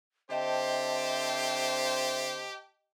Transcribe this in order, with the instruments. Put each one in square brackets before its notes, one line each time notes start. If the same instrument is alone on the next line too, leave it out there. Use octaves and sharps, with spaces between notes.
[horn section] D3 C4 C5 [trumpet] G4 [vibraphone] D#5 G5 A5 [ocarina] E5